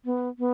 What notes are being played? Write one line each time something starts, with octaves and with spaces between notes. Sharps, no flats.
B3
B3